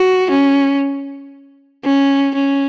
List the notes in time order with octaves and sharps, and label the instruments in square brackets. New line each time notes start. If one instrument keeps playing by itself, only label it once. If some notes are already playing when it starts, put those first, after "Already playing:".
Already playing: [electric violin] F#4
C#4
C#4
C#4